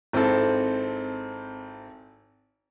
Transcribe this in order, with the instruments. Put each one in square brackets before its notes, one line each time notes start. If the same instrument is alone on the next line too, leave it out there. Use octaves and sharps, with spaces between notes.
[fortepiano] G#1 C4 E4 A4